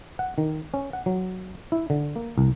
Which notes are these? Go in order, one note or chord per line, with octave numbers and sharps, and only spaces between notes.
F#5
D#3
C#4
F#5
F#3
E4
D3
A#3
C2